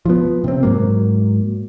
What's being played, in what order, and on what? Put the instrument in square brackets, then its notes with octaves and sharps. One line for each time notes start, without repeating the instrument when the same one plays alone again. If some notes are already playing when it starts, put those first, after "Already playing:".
[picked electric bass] F3 B3
C3 C4
G#2 F#3 A#3